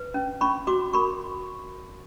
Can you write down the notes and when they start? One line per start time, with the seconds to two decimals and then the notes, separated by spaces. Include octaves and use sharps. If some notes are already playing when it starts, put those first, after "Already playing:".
Already playing: B4
0.14 C#4
0.41 C#4 B5 C#6
0.67 F#4 C6 D6
0.93 A#4 B5 C#6